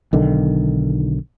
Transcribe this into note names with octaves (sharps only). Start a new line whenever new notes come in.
B1 D3 D#3